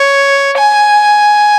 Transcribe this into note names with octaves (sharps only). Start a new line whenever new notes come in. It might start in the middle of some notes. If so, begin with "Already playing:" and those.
Already playing: C#5
G#5